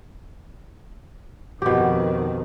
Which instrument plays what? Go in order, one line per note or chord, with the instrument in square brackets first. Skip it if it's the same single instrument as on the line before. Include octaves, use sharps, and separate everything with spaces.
[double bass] F2 D#3 [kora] B2 G4